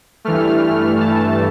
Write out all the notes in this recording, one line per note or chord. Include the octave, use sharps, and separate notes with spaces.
G2 E3 A3 F6
F6
A5